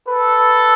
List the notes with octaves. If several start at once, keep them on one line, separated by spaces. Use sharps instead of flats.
A4 B4